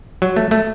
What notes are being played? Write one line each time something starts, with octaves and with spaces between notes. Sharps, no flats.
F#3
A3
A3